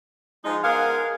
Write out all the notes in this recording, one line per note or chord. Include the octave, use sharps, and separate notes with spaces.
F3 G#3 D#4
B3 G#4 A#4 F5 F#5